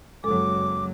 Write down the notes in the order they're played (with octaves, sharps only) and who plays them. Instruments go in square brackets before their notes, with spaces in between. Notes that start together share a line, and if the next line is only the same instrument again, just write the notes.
[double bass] F#1 F#3 [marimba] G#3 A4 [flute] D6